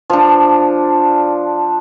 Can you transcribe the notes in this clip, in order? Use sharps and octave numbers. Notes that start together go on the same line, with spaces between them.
F3 D4